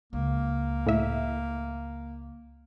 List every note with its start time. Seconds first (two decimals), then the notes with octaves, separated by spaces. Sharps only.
0.13 C#2 A#3
0.87 A2 E5